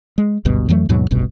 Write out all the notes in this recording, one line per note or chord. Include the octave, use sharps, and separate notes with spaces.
G#3
G#1 D2 G2 B2
F2 E3 F#3 A3
D#2 G#2 B2 F#3
F1 B1 G2 B2